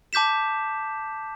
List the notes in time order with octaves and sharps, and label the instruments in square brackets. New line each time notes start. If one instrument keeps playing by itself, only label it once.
[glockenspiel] A5 D6 G6 B6 E7